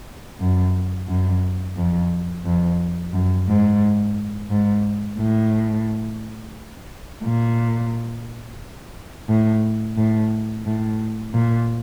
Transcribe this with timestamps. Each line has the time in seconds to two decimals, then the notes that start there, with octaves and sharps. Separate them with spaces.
0.40 F#2
1.08 F#2
1.77 F2
2.45 F2
3.13 F#2
3.48 G#2
4.50 G#2
5.19 A2
7.24 A#2
9.29 A2
9.97 A2
10.66 A2
11.34 A#2